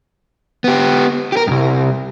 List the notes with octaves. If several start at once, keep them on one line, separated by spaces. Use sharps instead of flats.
B3 G4
G4 A#4
C2 F#2